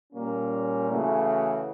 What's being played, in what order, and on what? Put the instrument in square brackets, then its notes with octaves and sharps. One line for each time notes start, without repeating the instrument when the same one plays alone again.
[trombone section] A#2 G3 A#3 C#4
C#3 E3 A3 C#4 F#4